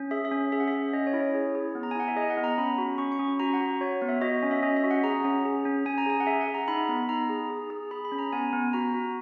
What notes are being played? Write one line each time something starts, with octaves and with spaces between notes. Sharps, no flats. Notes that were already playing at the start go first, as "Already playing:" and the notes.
Already playing: C#4
G#4 E5
E5
C#4
G#4 E5
F#5
E5
C#4
C#4 D#5
C#5
E4
C#5
G#4
G#4
B3
A#5
G#5
E4 F#5
E5
G#4 D#5
F#5
B3
A#5
C#4 B5
F#4
C#4 C#6
C#6
C#4
F#4 A#5
F#5
F#4
F#4 C#5
B3
E5
F#4 D#5
C#4
E5
C#4 D#5
E5
F#4
F#5
G#4 A#5
C#4
G#4
C#4
C#4 G#5
A#5
G#4 G#5
F#5
G#4 E5
F#5
G#4
A#5
D#4 B5
B3
D#4 A#5
G#4
G#4
G#4
G#4 B5
B5
C#4
A#5
B3 G#5
B3
F#4 A#5
F#4